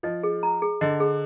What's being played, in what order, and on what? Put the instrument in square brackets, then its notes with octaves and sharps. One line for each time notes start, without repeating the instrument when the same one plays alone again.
[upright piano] F3 [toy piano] D#5
[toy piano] G#4
A#5
G#4
[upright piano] D3 [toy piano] D#5
[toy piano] G#4